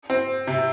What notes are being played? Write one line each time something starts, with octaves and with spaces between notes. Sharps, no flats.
C4
C3